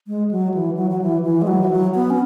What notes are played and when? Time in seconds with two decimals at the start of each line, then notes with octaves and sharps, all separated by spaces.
0.07 G#3
0.31 F#3
0.54 E3
0.77 F#3
0.90 F#3
1.02 E3
1.25 E3
1.42 G#3
1.47 F#3
1.64 E3
1.71 F#3
1.95 B3
2.10 C#4